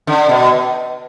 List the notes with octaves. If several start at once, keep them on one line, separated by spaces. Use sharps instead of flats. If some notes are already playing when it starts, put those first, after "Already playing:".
D3
B2